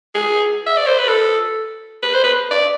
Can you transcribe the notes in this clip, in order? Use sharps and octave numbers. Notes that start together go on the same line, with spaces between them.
G#4
E5
D5
C5
B4
A4
B4
C5
B4
D5